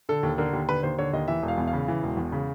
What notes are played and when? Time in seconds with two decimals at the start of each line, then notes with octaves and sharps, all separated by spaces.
0.09 D3 A4
0.23 D#2
0.38 D3 A#4
0.53 D#2
0.69 D3 B4
0.83 D#2 C5
0.99 D3 C#5
1.13 D#2 D#5
1.28 E3 E5
1.43 E1
1.48 F5
1.58 E2
1.67 F5
1.73 C#3
1.88 E3
2.03 E1
2.17 E2
2.32 C#3